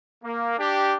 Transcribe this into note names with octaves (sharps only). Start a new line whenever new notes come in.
A#3
D4 G4